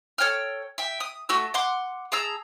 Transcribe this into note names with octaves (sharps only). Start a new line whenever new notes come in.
A4 C#5 G5 F6
E5 G5
D#6
A3 F#4 E6
F#5 C6 D6
G#4 A5 A#5 E6